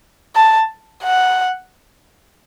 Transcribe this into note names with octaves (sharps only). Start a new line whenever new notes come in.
A5
F#5